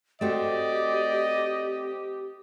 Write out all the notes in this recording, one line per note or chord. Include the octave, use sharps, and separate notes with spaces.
A3 C4 F#4 G4 D5 D#5